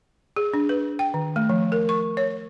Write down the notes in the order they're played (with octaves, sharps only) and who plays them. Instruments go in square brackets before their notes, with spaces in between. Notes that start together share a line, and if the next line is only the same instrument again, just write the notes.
[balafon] G#4
D4
B4
G5
D#3
A3
F3
A#4
C#6
C#5